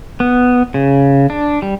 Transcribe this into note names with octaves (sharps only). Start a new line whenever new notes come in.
B3
C#3
D4
G3